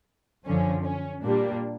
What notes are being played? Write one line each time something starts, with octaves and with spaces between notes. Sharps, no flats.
F#2 D3 F3 C#4
C#4
A#2 G3 A#3 D4